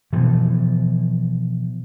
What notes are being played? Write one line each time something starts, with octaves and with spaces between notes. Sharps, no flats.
B2 E3 F3